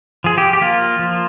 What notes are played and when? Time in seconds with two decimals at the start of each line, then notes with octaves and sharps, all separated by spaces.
0.24 F3 G#4
0.38 G4
0.53 G4
0.62 A#3 F4
0.99 F3